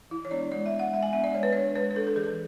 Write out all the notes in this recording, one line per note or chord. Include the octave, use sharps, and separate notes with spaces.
E3 E4
C#5
G#3 B3 D4 D5
G#3 D5
E5
B3 D4
F#5
G#3 E5
G#5
B3 D4 E5
D5
G#3 C#5
B4
D4 C#5
G#3 B4
B4
D4 A4
A4
E3 G#4